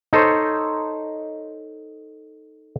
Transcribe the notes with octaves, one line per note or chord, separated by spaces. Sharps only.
D#4 A4 C5 C#5